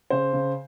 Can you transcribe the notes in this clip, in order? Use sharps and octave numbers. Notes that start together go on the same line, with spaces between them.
C#3 C5
C#3